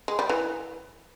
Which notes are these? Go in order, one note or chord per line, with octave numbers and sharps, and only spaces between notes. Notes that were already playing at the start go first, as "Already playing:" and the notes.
G#3
G3
E3